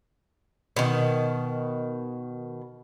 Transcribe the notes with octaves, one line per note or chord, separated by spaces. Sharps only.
B2 D#3